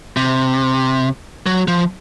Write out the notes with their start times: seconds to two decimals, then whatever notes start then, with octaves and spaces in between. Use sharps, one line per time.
0.17 C3
1.46 F#3
1.68 F3